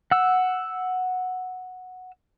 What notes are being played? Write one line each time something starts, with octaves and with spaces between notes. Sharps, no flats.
F#5 E6